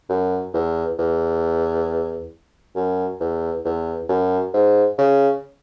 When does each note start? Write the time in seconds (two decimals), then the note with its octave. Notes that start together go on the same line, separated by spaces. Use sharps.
0.09 F#2
0.54 E2
0.99 E2
2.75 F#2
3.20 E2
3.65 E2
4.09 F#2
4.53 G#2
4.98 C#3